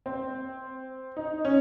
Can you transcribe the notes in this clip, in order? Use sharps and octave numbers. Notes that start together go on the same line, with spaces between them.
C4
D#4
C#4